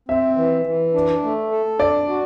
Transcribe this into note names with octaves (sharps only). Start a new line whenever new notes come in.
C4 E5
E3
E3
D4
A3
A4
D4 D5
F#4